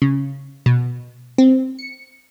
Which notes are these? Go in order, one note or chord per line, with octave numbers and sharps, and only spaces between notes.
C#3
B2
C4
C#7